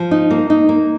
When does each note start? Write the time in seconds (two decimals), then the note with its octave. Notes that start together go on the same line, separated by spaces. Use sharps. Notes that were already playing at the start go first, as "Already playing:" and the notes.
Already playing: F3
0.11 D#4
0.31 A#3
0.50 D#4
0.69 A#3